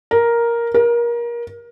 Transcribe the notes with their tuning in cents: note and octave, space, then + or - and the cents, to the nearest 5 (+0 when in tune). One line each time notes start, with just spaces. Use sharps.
A#4 +5
A#4 +25